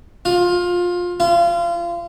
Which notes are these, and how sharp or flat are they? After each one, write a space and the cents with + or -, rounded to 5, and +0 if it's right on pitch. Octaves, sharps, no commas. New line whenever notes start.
F4 +20
F4 -30